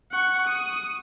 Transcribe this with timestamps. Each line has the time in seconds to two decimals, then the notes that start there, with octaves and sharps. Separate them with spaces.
0.12 F#5 C#6
0.48 D#6